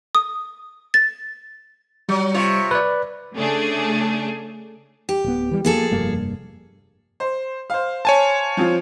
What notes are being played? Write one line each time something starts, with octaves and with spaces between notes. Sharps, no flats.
D#6
A6
F#3 G3
C3 F4 C#5
B4 D5
C#3 A3 D4 G#4
G4
D1 B3
E3 G3
F3 A#3 G#4 A4
F1 G2 A#3
C5
C5 F5
C#5 G#5 A5
F3 C4 F4